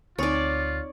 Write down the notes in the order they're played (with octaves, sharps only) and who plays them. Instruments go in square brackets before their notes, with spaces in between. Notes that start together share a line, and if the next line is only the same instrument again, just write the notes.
[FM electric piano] D2 [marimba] C4 D#4 G#5 [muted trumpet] F4 [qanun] C#5 D5